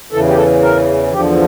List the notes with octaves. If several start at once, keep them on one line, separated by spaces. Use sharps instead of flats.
E2 C#3 E3 A4
G4
A4
A#4
E2 D3 F3 G4